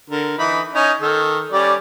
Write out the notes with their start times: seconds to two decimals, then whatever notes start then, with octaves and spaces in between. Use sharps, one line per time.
0.10 D3 A#4
0.38 E3 D#4 B5
0.75 C#4 D#4
1.01 D#3 A4
1.53 G3 C#4 D5